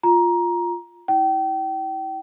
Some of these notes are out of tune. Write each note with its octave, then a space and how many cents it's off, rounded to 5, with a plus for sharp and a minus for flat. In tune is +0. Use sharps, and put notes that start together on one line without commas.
F4 +0 A#5 +15
E4 -30 G5 -30